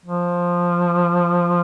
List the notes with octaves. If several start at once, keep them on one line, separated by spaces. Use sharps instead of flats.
F3